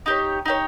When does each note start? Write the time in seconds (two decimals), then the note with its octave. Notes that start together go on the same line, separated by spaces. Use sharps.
0.06 D#4 G4 C#5
0.45 D#4 G4 C#5